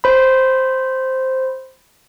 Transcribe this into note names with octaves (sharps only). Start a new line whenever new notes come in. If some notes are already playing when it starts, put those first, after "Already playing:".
C5 B5